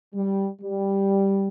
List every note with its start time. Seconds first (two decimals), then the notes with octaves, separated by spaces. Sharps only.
0.14 G3
0.61 G3